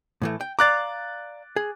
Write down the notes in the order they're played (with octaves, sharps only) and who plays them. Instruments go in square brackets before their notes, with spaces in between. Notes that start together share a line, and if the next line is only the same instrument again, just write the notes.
[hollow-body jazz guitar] A2 E3 A3
G5
[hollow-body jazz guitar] D5 F5 A#5 [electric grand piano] D6 F#6 A6
[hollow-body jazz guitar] G#4